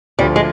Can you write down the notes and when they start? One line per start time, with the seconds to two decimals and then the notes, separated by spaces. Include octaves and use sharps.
0.19 D2 D3 F3 G3
0.36 G#3